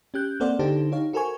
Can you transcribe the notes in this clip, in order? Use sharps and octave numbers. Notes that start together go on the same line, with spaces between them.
C#4 G4 F#6 G6
A#3 C4 A4 C5 D5 F#5
D3 D4 D#4 G4 A4 C5
D#4 G4 C#5 F5
F#4 A4 A#4 C5 G#5 C#6